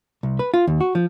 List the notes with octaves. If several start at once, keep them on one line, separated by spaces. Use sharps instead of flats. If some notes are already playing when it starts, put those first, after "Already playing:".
C2
B4
F4
D#2
F#4
F3